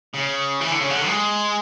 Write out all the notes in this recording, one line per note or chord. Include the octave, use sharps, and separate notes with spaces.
C#3
E3
D3
C#3
D3
G#3